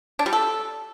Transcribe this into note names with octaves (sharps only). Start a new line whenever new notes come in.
D4
G3
A4